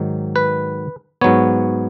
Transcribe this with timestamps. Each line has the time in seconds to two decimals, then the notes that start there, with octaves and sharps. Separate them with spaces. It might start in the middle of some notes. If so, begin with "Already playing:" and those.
Already playing: G#2 D#3 F#3
0.36 B4
1.21 G#2 F#3 B3 C#5